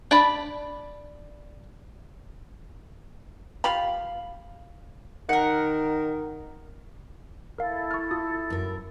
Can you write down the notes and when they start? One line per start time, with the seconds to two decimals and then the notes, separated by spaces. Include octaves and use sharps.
0.11 D4 A5 B5
3.64 F4 G4 F5 B5
5.29 D#3 A#4 F#5
7.58 E4 A4 A#4 F5
7.91 C#6 F6
8.11 F4 D#6
8.50 F#2 A#4